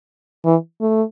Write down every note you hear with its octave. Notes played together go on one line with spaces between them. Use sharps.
E3
A3